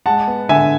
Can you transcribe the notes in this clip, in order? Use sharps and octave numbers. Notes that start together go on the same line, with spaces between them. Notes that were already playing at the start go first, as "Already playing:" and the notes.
G#3 F#5 A5
B3
D3 E5 G#5